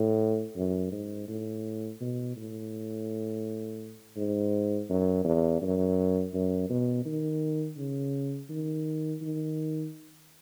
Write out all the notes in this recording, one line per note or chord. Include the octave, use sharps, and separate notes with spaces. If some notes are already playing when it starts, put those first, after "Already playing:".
Already playing: A2
F#2
G#2
A2
B2
A2
G#2
F#2
E2
F#2
F#2
B2
D#3
C#3
D#3
D#3